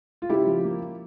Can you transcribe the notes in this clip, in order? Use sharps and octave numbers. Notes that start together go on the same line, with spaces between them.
F4
C#3 E4 G4
F3
A#3